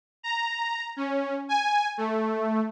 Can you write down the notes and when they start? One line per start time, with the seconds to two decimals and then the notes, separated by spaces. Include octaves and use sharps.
0.23 A#5
0.97 C#4
1.49 G#5
1.98 A3